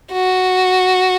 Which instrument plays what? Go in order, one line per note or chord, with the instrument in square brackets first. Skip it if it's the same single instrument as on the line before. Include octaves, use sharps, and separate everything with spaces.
[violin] F#4